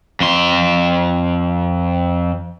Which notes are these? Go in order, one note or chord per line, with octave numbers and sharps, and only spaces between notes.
F2 C6